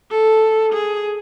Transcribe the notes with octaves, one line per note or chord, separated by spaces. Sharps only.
A4
G#4